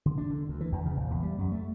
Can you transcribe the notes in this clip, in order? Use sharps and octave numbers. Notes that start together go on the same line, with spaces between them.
D3
D4
D3
D2
E3
E2
C#3
A#1
E2
G3
F#2
A3